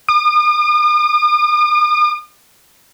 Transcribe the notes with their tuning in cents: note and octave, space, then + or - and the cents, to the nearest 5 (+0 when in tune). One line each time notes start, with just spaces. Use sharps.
D#6 -45